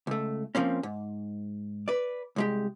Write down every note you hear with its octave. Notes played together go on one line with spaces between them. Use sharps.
C#2 A3
F3 A#3 C4 C#4
G#2
B4 D5
C2 G#3 G4